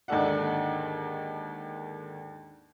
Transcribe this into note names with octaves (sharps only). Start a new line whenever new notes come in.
D#2 G#2 D3 A4 D5 F#5